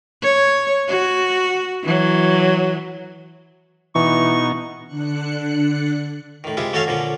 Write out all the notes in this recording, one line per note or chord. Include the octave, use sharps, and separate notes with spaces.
C#5
F#4
E3 F#3
B2 E3 D#4 C#6
D3 D4 F#6 C#7
A2 D#3
C3 G#3 E4 F4
A3 C#4 F#4 A4 C#5 F5
A#2 D3 F3 C#4